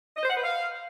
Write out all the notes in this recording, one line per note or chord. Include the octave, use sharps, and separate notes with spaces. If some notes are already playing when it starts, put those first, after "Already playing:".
D#5
C5
F#5
B4
F5